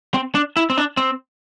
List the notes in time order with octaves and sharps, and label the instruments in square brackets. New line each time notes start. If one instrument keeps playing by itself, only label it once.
[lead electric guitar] C4
D4
E4
C4
D4
C4